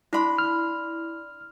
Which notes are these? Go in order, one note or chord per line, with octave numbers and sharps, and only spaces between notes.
D4 E4 B5 C6
F6